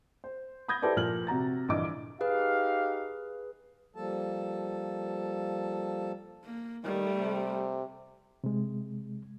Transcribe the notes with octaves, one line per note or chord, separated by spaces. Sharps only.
C5
B5 D#6 G6 G#6 A#6
E4 G4 A4 B4 C5 D5
A#2 F3 F6 F#7
C3 F#4 A#5 A6
A#1 G2 D3 E3 D#5 D6
D#4 G4 G#4 B4 F5
F3 G3 A#3 A4 A5
A#3
D#3 G3 A3
C3
C3 G#3